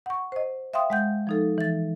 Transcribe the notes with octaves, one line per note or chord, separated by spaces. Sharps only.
F#5 C#6
C5 D#5
E5 F5 G5 C6 D#6
G#3 F#5 G6
F3 D#4 A4
E3 A6